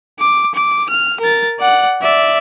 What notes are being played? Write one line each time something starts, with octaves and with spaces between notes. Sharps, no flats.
D6
D6
F6
A#4 A6
D5 F#5
D5 E5